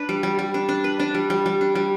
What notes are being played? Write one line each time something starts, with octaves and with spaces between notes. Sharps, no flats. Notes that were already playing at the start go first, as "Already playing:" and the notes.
Already playing: D4 B4
G3
G3
G3
D4
D4
B4
D4
G3
G3
G3
D4
G3